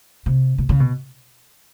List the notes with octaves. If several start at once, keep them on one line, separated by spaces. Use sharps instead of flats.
C3
B2
C#3
B2